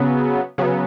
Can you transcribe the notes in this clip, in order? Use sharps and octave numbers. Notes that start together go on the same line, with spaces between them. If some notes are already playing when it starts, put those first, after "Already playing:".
Already playing: C#3 F#3 B3
C#3 F#3 B3